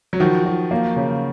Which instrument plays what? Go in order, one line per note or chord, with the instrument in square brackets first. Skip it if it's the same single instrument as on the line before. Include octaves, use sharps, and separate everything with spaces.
[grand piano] F#3
[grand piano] D#3 F3 [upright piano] F#4
[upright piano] F#4
A#3
C#3